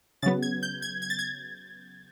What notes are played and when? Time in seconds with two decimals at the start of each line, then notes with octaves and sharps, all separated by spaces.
0.22 C#3 F#3 B3 A6
0.42 G#6
0.63 G6
0.82 G#6
1.02 G#6
1.10 A6
1.19 G#6